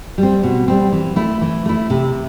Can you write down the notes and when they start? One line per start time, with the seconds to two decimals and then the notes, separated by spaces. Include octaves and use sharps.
0.18 G3
0.23 C4
0.43 B2
0.68 G3 C4
0.92 E3
1.16 A3 E4
1.42 E3
1.66 A3 E4
1.90 C3